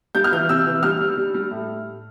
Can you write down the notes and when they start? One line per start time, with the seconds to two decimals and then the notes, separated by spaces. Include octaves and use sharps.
0.15 G3 G6
0.24 F6
0.32 E3 G6
0.49 C3 E6
0.67 E3
0.83 G3 F6
1.01 G3
1.17 G3
1.34 G3
1.51 A2